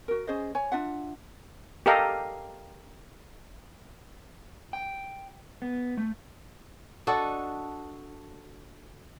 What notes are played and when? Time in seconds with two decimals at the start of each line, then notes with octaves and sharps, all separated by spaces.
0.08 F#4 A#4
0.27 C#4 G#4 C5 D#5
0.55 C#5 G#5
0.72 D4 F4 E5 F#5
1.86 G4 A4 A#4 D#5 F5
4.73 G5
5.62 B3
5.97 A3
7.07 D4 F#4 A4 D#5